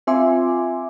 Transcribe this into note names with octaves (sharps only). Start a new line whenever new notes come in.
C4 F4 E5 G#5 C6 D6